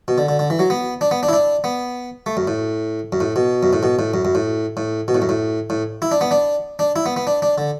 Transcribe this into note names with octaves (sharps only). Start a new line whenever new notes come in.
B2
D3
D3
D3
E3
F#3
B3
D4
B3
D4
E4
D4
B3
A3
F#2
A2
F#2
A2
B2
F#2
A2
B2
A2
F#2
F#2
A2
A2
B2
A2
F#2
A2
A2
E4
D4
B3
D4
D4
E4
B3
B3
D4
D4
D3